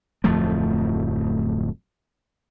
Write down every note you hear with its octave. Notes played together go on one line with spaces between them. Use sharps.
D1 F2 F3 A3